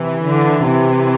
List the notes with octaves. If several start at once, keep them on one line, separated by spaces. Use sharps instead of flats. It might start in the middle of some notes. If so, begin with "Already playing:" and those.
Already playing: C3 E3
D3
C3